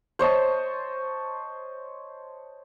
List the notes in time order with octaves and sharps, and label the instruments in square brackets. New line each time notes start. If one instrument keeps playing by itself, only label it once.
[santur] C5 C#5 D#5 A5